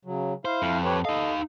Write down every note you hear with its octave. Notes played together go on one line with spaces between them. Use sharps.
C#3 F#3
E4 C5 F5
F2
G4 B4 C#5
D#4 A4 D#5 F5